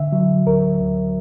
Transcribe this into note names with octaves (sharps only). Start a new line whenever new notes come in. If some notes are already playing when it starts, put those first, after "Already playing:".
Already playing: D3 E5
F#3
D2 A#4
D2